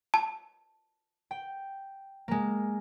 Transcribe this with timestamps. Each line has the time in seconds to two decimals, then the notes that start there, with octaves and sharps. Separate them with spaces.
0.14 A5
1.31 G5
2.28 G#3 A#3